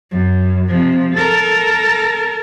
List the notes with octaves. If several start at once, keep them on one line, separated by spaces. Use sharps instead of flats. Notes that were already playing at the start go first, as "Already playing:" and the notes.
F#2
C3 F3
A4 A#4